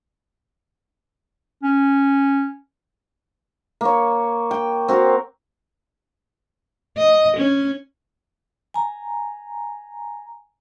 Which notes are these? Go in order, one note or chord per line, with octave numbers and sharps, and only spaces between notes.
C#4
A#3 C#5
G5
C4 F#4 A#4
D#5
C#4
G#5 A#5